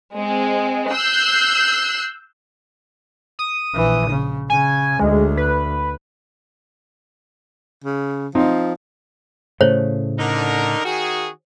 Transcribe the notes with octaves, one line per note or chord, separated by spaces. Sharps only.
G#3 C4
E6 F#6 G6 C7
D#6
A#1 E3
C#3
C#3 G#5
D2 G#3
B4
C#3
F3 C4 D#4
A2 C#3 A3 C5 C#5
D3 D#4 A#4
D#3 F#4 G#4